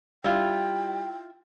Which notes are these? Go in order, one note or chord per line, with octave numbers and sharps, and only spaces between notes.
G3 E4 F4 G5